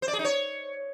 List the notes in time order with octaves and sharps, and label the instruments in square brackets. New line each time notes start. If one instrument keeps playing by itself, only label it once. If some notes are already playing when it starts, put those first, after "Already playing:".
[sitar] C5
D5
G#4
D#4
C#5